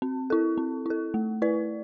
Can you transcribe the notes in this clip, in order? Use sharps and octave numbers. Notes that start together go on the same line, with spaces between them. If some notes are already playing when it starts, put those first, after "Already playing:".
C4
E4 A4
C4
E4 A4
A3
E4 B4 D5